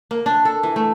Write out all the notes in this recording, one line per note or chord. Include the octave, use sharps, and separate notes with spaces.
A#3
D4
A4
E3
A3